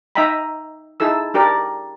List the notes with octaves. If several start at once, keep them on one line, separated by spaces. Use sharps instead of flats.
D#4 D#5 E5 G5 A#5 B5
D#4 E4 G#4 A4 E6
D4 G4 A#4 D5